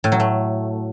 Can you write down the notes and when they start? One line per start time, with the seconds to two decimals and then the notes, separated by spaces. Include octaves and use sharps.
0.04 A2
0.12 F#3
0.20 A3